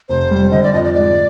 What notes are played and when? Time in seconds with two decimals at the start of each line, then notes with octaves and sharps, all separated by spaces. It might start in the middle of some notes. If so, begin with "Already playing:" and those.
0.09 F1 C5
0.31 G3
0.51 D3 D#5
0.63 D5
0.73 F2 D#5
0.84 D5
0.94 G#2 D5